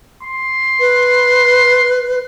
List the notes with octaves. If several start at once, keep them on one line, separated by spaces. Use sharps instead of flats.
C6
B4